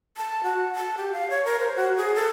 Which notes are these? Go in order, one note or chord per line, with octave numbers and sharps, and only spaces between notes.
A5
F#4
A5
G4
F5
C#5
A#4
C5
F#4
G#4
A4